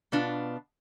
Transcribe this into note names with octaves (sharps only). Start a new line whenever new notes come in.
B2 B3 D4 F4